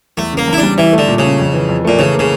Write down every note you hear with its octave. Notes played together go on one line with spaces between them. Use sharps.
E2 A3
C#3 A#3
E2
E4
D4
G3
E3 E4
A3
D3
A#2
C#3
C#4
F2
E3
F2
A#2 A3
C#3 E3
A#3
C#3